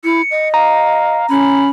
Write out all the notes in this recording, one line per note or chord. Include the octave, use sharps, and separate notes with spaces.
E4 C#7
D#5
F5 A#5
C#4 B5